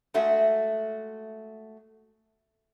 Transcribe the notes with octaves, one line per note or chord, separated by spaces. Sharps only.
G#3 A3 F#4 E5